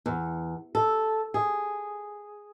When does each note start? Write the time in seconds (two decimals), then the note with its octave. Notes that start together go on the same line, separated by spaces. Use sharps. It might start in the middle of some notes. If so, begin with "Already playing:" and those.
0.06 E2
0.75 A4
1.34 G#4